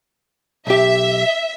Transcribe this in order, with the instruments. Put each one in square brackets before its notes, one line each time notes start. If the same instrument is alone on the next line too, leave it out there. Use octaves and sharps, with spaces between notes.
[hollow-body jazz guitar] B1 G4 [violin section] E5